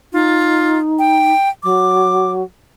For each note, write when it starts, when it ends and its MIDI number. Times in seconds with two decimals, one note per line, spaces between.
0.13 1.32 63
0.13 0.78 65
0.99 1.49 79
1.63 2.42 54
1.63 2.31 86